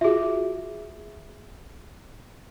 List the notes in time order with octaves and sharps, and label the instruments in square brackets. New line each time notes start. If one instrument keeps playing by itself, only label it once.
[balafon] F4 F#4 [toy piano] G#4 E5